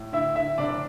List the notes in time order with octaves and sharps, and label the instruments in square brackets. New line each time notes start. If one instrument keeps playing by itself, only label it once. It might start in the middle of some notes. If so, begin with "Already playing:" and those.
Already playing: [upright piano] A2
D3 E4 E5
D3 E4 E5
F1 D4 D5